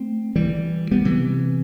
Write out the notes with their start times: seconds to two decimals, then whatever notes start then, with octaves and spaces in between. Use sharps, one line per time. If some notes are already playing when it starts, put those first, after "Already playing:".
Already playing: A3 C4
0.36 E3 G3
0.91 G3 B3
1.05 C3 E3